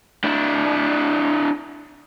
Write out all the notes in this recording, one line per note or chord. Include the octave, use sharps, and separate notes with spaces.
D4 E4